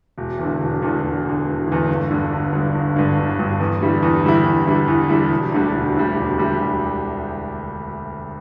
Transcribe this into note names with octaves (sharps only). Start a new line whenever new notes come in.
E1
E2 D3
E1
E2 D3
E1
E2 D3
E1
E2 D3
G1
G2 D3
G1
G2 D3
G1
G2 D3
G1
G2 D3
E2
D3 G3 E4
E2
D3 G3 E4
E2
D3 G3 E4
E2
D3 G3 E4
E1
D2 D3 G3
E1
D2 D3 G3
E1
D2 D3 G3
E1